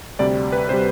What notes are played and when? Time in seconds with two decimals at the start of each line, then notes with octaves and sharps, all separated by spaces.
0.19 D2 C3 G3 D5
0.52 B4
0.69 C3 G3 C5